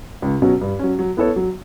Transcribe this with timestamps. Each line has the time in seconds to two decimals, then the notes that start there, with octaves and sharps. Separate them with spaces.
0.22 C#2
0.42 B2 F#3 C#4
0.61 G2
0.79 F#3 C#4
0.99 F#3
1.17 B3 E4 A4 C#5
1.36 F#3